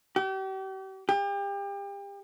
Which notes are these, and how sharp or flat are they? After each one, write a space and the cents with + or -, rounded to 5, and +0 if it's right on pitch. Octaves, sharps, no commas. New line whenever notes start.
G4 -40
G4 +35